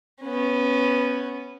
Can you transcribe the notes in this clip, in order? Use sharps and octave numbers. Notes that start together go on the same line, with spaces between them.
B3 C#4